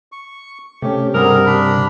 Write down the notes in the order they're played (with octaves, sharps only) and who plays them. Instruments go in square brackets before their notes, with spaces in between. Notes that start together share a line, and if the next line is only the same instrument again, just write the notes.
[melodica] C#6
[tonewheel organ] C3 [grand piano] A3 C#4 [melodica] G4
[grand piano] G2 F#5 [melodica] G3 C4 G#4 [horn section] A#4
[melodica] D4 B5